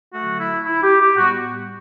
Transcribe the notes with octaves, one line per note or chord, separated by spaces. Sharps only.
D3 F#3 A3 F#4
E4
E4
G4
G4
A2 G3 B3 F#4